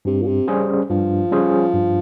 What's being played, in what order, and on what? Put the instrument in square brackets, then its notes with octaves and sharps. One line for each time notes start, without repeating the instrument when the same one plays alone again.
[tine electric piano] G2 [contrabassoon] C3
[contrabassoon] A#2
C3
[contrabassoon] C#3 [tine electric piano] G3 C#4 G#4 C5
[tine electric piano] G2 [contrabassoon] F3
[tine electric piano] G3 C#4 G#4 C5
G2